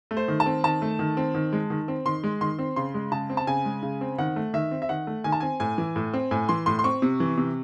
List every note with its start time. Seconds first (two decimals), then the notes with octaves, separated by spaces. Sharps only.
0.11 A3
0.17 C5
0.28 D#3
0.40 A5
0.46 C4
0.64 D#3 A5
0.82 A3
0.99 D#3
1.17 C4
1.34 D#3
1.53 G#3
1.70 D#3
1.88 C4
2.05 D#3 C6
2.24 G#3
2.41 D#3 C6
2.59 C4
2.76 C#3 C6
2.94 G#3
3.12 C#3 A5
3.30 C4
3.37 A5
3.47 C#3 G#5
3.65 G#3
3.83 C#3
4.01 C4
4.18 D#3 F#5
4.36 A3
4.54 D#3 E5
4.71 C4
4.82 E5
4.89 D#3 F#5
5.07 A3
5.24 D#3 G#5
5.32 A5
5.40 C4 G#5
5.60 A2 G#5
5.78 E3
5.96 A2
6.14 C4
6.31 A2 G#5
6.49 E3 C6
6.66 A2 C6
6.79 C6
6.84 C4 C#6
7.02 C3
7.20 E3
7.38 C3